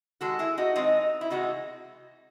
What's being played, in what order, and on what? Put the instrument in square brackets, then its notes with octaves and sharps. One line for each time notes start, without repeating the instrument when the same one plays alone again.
[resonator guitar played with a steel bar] D#3 G#3 F#4 A4
E4 G#4
D#4 F#4
D#3 G#3 C4 D#4
E4
C3 E3 G#3 D#4 F#4